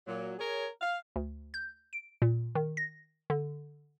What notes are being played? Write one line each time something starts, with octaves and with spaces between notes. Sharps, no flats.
A#2 F#3
G#4 A#4 C#5
F5
D2
G6
D7
A#2
D#3
A#6
D3